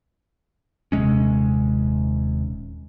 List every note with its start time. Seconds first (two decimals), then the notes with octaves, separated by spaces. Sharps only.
0.92 D#1 C3 G#3 C#4